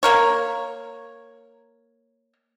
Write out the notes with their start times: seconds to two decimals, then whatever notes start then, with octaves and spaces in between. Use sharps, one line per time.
0.03 A#3 A#4 C#5